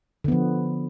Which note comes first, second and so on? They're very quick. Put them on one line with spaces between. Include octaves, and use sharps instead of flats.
D3 B3 F3